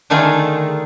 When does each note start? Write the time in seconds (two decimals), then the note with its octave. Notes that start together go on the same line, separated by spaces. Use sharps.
0.10 D3 D#3 A3 D#4 F4 G#4